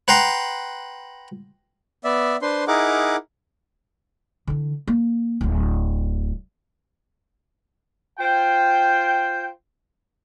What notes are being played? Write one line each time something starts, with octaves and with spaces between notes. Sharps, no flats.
B4 F#5 G5 A#5 C6
B3 D5 E5
D4 B4 C5 C6
D#4 E4 G#4 A#4 F#5 D6
D3 E3
A#3
D1 D2
F4 C5 G5